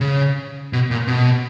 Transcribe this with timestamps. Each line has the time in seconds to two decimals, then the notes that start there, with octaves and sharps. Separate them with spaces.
0.01 C#3
0.73 B2
0.91 A#2
1.08 B2